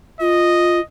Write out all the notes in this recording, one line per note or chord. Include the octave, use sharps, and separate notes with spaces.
F4 D#5